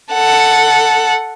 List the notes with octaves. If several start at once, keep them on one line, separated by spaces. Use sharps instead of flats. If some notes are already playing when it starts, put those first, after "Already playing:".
A4 F#5